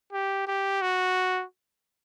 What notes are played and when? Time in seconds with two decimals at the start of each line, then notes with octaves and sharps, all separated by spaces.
0.13 G4
0.47 G4
0.82 F#4